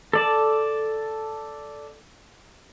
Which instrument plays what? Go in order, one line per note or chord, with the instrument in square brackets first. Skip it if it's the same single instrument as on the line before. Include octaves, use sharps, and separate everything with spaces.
[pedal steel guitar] A4 D5 A5